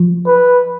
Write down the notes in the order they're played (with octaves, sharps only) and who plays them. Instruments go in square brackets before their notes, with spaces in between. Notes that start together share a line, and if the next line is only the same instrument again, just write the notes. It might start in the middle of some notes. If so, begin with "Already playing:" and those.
Already playing: [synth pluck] F3
[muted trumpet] B4